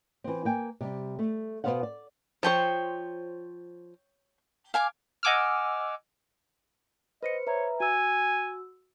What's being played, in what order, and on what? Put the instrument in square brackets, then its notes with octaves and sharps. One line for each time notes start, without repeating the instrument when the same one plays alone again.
[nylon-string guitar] E3 C4
A#3 G5 G#5
C3 G3
A3
B2 G3 B3 C5 F5 F#5
D5
[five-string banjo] F3 C5 [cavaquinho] C#5 G5 C#6
[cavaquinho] F5 G#5 D6
[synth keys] D#5 F#5 G#5 D6 E6 F6
[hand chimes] B4 C5 C#7 [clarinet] D#5
[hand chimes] B4 E5 A#5 [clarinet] C#5
[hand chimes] F#4 E6 [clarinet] G#5